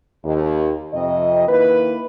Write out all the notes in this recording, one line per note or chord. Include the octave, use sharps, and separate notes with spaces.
D#2
F2 C3 D#5
D#3 A#3 E4 B4